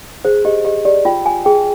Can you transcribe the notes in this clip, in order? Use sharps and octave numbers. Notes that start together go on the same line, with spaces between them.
G#4 C5
G4 D#5
G4 D#5
G4 D5
F4 G5
G#5
G#4 G5